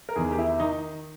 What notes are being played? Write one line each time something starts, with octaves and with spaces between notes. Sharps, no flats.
A#4
E2 D#3 G#4
G4
E4
D#3 D#4